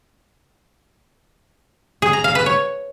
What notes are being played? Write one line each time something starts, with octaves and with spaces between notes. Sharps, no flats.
G#4
A#5
F5
B4
C#5